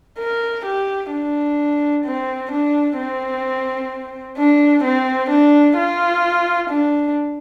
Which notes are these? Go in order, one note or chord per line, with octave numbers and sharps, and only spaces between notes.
A#4
G4
D4
C4
D4
C4
D4
C4
D4
F4
D4